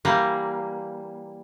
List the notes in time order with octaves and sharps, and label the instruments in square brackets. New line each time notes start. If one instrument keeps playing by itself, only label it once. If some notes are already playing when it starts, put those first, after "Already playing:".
[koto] E3 G3 A#3